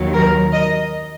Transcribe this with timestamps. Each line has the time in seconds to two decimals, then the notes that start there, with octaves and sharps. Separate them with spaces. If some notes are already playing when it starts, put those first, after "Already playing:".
Already playing: D#2 D#3 F#3
0.13 A#4
0.52 D#5